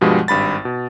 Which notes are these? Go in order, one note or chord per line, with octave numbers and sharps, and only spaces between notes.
G2 B2 F3 G3 G#3
G#1 G2 B5 A6
B2